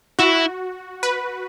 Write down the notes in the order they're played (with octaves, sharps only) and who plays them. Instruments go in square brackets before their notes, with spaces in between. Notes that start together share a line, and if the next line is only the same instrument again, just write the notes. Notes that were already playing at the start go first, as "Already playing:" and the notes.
[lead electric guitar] E4 [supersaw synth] F#4
[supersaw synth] B4